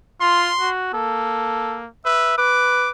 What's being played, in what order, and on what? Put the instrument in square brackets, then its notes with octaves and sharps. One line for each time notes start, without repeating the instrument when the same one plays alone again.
[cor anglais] F4 [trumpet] C6
[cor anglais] F#4
[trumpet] A#3 [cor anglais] A4
[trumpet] B4 [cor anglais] E5
[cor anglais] B4 [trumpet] D6